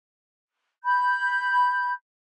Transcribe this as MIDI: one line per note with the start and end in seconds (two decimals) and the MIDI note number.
0.84 1.92 83
0.84 1.92 91